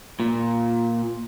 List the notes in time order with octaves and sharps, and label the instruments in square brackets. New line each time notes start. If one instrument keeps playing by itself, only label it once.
[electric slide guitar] A#2